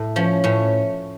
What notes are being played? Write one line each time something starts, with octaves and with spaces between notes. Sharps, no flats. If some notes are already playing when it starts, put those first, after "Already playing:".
Already playing: A2
F3 C#4
A2 C#4